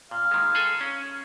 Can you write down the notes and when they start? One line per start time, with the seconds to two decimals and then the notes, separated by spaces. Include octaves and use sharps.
0.11 A#2 F5
0.31 D#3 G#3
0.55 G#4 A4 G#5
0.81 C#4